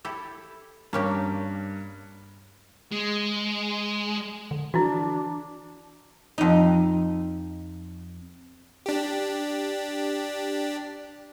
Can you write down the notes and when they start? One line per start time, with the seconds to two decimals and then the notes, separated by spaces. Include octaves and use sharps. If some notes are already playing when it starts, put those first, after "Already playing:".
0.05 E4 G4 A4
0.93 G2 A#3 C#4 G4 A#4
2.92 G#3
4.51 D3
4.74 E3 D4 E4 F#4
6.38 F2 D#4
8.86 D4 G4